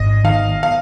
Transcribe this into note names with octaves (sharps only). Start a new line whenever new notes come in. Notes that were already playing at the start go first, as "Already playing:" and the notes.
Already playing: G#1 D#5
D#3 F5
F5